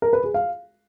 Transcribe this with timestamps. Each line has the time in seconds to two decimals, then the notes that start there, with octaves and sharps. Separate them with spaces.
0.02 A#4
0.13 B4
0.24 G#4
0.34 F5